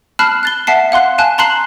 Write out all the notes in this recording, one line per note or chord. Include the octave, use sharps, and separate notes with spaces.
A5 B5 F6 F#6 C7
F#6 A6 G7
E5 F#5 A5 C7
F5 F#5 C6 F#6
F5 G#5 A5 F#6
A5 A#5 C6 F#6 C7 F#7